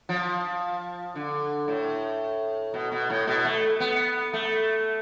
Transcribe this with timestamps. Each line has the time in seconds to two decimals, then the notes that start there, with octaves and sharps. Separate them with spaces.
0.09 F3
1.15 D3
1.68 A2
2.74 B2
2.92 B2
3.10 A2
3.27 B2
3.45 A3
3.80 B3
4.33 A3